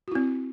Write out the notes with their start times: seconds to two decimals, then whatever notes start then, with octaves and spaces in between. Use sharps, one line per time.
0.08 F#4
0.12 E4
0.15 C4